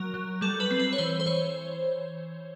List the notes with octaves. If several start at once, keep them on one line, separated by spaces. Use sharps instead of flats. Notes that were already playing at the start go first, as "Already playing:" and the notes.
Already playing: F#3 A#4
F#3
G3 A4
B4
C4
B4
C#5
E3 C5
C5
E3 C#5